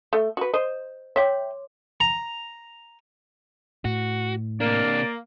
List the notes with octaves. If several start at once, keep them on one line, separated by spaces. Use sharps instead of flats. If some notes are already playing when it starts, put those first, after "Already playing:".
A3
F#4 B4
C5 D#5
C#5 E5 G5 C6 D6
A#5
A2 F#4
C3 A#3 D4 D5